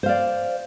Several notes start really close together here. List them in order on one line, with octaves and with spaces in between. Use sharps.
C5 F5 D5